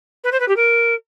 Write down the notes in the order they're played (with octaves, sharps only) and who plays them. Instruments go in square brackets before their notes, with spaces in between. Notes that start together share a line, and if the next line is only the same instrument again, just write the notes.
[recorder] B4
C5
B4
G4
A#4